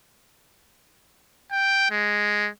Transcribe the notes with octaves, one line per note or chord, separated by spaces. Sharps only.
G5
G#3